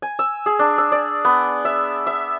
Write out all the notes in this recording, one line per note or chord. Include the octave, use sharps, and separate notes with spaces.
G#5
E6
G#4
D4
E6
D5
B3
E5
E5